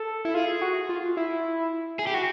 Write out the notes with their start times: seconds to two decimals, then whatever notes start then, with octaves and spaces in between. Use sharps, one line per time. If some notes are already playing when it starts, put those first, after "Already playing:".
Already playing: A4
0.25 E4
0.34 F4 G#4
0.62 F#4
0.89 F4
1.17 E4
1.99 G#4
2.07 G4
2.14 F#4